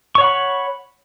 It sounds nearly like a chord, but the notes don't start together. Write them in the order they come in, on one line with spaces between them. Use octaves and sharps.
C#6 C#5 F#5 B5